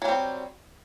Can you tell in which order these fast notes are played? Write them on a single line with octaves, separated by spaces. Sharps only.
F#3 G3 C4